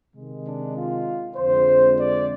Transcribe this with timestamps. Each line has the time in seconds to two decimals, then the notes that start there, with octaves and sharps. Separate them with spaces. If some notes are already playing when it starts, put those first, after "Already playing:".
0.15 C3 D#3 G#3
0.46 D4
0.75 F4
1.37 F2 D3 G#3 C5
1.98 D5